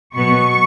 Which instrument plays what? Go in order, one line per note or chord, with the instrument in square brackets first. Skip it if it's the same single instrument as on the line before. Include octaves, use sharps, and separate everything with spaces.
[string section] B2 F#3 B3 C#6